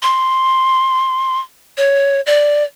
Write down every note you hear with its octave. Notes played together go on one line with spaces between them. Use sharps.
C6
C#5
D5